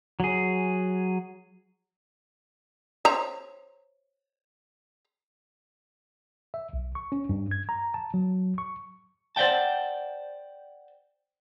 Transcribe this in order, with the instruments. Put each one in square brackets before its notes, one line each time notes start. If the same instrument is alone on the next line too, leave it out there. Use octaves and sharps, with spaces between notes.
[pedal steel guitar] F#3 G#4
[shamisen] C5 C#5 A#5
[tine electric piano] E5
B1
C#6
C#4
G2
G#6
A#5
A5
F#3
C#6
[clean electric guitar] C5 D5 E5 F#5 G5 A5